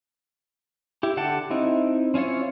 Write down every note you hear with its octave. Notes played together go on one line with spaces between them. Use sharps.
E4 G4
D3 G4 F#5 G5 A5
C4 D#4 E4
C4 C#4 E4 F4 C#5